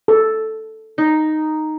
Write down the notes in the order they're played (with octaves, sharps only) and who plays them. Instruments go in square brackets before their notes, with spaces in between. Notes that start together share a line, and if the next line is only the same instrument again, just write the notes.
[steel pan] A4
[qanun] D#4